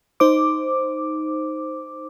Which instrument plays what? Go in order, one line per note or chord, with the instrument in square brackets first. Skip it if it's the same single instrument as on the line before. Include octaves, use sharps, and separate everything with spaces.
[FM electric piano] D#4 C5 D6